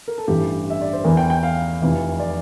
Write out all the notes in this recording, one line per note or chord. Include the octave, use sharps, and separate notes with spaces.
A#4
A4
A1 G2 E3 G4
E5
D5
C5
E2 E3 A#4
G5
G5
F5
F1 F2 E3
D5